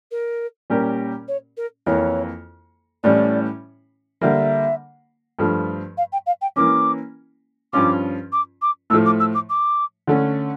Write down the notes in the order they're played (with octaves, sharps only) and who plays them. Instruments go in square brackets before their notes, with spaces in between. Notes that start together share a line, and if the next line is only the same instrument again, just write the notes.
[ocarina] A#4
[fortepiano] A#2 G3 C#4 G4 A#4
[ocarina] C#5
A#4
[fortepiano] F2 E3 A#3 [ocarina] C#5
[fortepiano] A2 E3 G3 C#4 [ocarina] D5
[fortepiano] D3 G3 A#3 [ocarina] E5
[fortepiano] G2 F3 A3
[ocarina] F5
G5
F5
G5
[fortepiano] E3 A#3 C#4 [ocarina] D6
[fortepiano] G2 F3 C#4 F4 [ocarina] D6
[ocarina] D6
D6
[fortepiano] A2 F3 A3 [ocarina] E6
[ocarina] D6
E6
D6
D6
[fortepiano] D3 A3 C#4